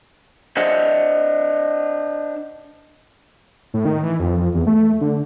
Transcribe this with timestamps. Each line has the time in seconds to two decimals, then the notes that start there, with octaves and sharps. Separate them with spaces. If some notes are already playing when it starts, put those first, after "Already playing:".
0.57 D4 C5 D#5 E5 F#5
3.74 A2
3.85 D#3
4.03 E3
4.19 F2
4.37 F2
4.54 E2
4.67 A3
5.01 D3